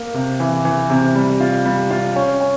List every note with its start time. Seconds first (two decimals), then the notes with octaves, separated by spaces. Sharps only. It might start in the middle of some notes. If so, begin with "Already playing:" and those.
Already playing: A#3
0.14 C3
0.40 E3
0.65 E3
0.90 C3
1.15 G3
1.40 F4
1.66 G3
1.90 F4
2.16 C#4
2.41 C#4